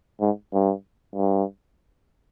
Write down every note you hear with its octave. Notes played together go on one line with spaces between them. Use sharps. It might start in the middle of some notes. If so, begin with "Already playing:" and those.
G#2
G2
G2